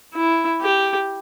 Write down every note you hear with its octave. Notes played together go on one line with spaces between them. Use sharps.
E4
G4